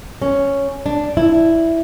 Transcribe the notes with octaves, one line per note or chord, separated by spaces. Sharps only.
C#4
D4
E4